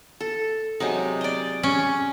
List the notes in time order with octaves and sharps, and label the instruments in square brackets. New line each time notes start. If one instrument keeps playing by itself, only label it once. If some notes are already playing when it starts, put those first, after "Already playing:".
[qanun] A4
[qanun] C3 F#3 G#3 [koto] D#4
[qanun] D5 D#5
[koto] C#4